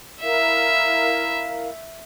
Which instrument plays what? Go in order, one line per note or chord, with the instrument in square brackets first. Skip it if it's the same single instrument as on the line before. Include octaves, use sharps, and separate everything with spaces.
[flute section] E4 A#4 F5 [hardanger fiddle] E5